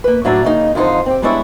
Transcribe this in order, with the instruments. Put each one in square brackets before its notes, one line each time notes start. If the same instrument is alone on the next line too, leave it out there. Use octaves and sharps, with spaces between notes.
[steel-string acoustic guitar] A#3 B4
A2 F#3 D4 D5 E5 A#5
C#3 A#3 D#4
F2 D3 D#4 F4 C5
C4 G4
G3 G#3 B3 D4 E4 C#5